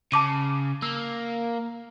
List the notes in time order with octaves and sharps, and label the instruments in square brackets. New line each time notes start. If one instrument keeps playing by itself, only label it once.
[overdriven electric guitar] C#3 [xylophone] A5 D6 D#7
[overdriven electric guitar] A#3 [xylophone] E6